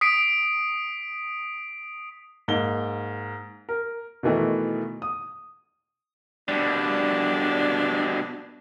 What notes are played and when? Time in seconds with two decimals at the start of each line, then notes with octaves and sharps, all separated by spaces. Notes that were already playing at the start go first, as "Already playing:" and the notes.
0.01 D#6 B6 C7 D7
2.48 G#2 A#3 G7
3.69 A#4
4.23 B2 D#3 E3 A3
5.02 D#6
6.48 B2 G3 D4